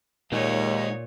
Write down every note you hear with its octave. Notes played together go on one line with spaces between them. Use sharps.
D#2 A#2 G#3 D#4 C#5 F5